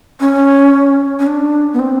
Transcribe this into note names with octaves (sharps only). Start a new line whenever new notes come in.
C#4
C#4
D4
B3
C4